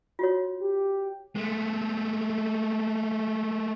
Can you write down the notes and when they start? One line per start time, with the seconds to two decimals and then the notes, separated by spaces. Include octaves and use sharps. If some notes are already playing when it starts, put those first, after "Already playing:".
0.19 F4 F#4 C#5
0.60 G4
1.35 G#3 A3